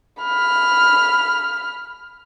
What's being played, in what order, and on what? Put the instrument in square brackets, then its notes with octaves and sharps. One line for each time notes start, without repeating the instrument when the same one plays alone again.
[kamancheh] B5 F6